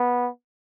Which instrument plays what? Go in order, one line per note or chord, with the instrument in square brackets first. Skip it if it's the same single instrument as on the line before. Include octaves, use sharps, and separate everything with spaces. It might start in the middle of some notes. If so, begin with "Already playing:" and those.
Already playing: [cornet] B3